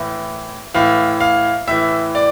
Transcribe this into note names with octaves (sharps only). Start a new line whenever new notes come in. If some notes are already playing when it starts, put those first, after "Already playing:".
Already playing: A2 E3
A2 E3 F5
F5
A2 E3 E5
D5